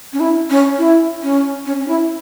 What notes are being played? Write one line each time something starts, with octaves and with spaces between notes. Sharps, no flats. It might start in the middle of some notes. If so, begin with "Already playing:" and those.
C#4
E4
C#4
E4
C#4
C#4
C#4
E4